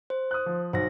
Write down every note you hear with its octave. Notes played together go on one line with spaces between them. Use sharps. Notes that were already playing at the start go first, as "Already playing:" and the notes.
C5
D#6 F#6
F3
B1 F#4 C5 A#6